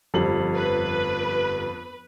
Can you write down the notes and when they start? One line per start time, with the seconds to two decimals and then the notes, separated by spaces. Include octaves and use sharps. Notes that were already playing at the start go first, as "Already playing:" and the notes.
0.14 G1 F2 G3 F#7
0.55 B4